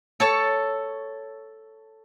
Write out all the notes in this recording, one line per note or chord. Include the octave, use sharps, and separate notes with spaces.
A4 C#5 A5